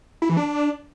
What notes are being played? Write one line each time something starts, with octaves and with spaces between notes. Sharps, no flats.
E4
E3
D4